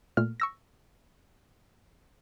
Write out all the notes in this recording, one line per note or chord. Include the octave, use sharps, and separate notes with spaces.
A#2 A3 F6
C#6 E6 A#6